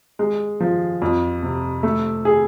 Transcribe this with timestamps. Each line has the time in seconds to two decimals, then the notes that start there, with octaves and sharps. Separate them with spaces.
0.19 G#3
0.60 F3
1.02 F2
1.43 C3
1.83 A3
2.25 G#4